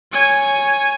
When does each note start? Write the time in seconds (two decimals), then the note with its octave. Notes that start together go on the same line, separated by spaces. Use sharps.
0.13 C#5 G#5